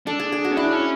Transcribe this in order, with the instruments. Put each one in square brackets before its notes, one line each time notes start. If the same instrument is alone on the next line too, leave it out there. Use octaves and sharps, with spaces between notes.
[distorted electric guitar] D4 [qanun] A4
[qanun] G#4
G#4
F#4
[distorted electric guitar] C#4
[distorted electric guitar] D4 [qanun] E4
[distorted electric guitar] C#4